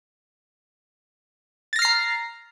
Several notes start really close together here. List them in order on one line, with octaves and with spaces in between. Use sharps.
A6 A#6 F6 C7 A#5